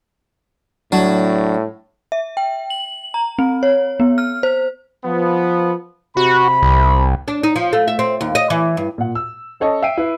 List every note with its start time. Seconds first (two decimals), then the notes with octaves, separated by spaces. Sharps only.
0.92 A2 F#3 D4
2.12 E5
2.37 G5
2.70 F#7
3.14 A#5
3.39 C4
3.63 C#5
4.00 B3
4.18 F6
4.43 C5
5.04 F3 B3
6.17 C3 F#4 B5
6.63 C2
7.28 D4
7.43 D#4
7.56 F3
7.73 A3
7.88 E5
7.99 C4
8.21 D#2
8.35 D#5
8.50 E3
8.77 G2
8.98 A#2 F#5
9.15 E6
9.60 C#4 A4 C#5 D#5
9.82 E5 G5 C7 D7 D#7
9.98 E4 B4